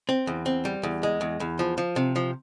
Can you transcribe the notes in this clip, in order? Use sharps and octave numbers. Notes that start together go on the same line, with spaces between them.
C4
E2
C4
G3
E2
G#3
E2
E2
F3
F3
C3
F3